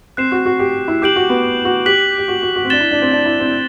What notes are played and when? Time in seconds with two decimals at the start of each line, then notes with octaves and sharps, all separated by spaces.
0.17 C4 F#6 C7 E7
0.32 F#4
0.46 F#4
0.59 G4
0.88 E4
1.02 G4 D6 G6 D7 F#7
1.16 F#4
1.29 B3
1.65 F#4
1.86 G4 F#6 B6 F#7
2.18 G4
2.28 F#4
2.43 F#4
2.56 F#4
2.65 C4
2.70 D4 A6 E7 G7
2.80 E4
2.92 D4
3.01 C4
3.12 D4
3.26 E4
3.40 C4